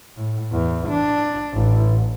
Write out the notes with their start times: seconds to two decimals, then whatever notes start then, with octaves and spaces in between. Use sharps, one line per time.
0.17 A2
0.52 E2
0.90 D4
1.53 A1